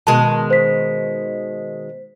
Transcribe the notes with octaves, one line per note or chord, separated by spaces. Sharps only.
B2 D#3 G#3 A5
C5 B6